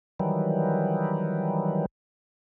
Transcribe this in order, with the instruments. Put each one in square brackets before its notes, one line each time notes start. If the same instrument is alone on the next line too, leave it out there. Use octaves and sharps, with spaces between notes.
[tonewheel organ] D#3 E3 F#3 G3